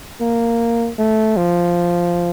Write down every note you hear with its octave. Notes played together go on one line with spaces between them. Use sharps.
A#3
A3
F3